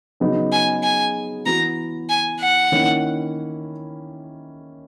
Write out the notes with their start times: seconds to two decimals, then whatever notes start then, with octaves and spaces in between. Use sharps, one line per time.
0.20 C#3 F#3 B3 D#4
0.52 G#5
0.83 G#5
1.45 E3 B3 F#4 A#5
2.09 G#5
2.40 F#5
2.72 D#3 A#3 C#4 E4